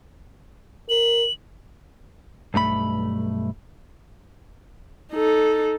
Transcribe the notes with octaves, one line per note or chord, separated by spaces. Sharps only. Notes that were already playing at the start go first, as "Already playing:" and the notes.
A#4 F#7
B1 G2 A3 B5
D#4 A4